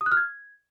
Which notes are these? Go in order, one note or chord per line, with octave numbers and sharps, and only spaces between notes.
D#6
F#6
F6
G#6